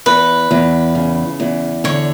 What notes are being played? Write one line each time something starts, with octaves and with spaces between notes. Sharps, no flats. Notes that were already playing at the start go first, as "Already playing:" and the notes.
E2 B4
E2
C#3
E2
D3 C#5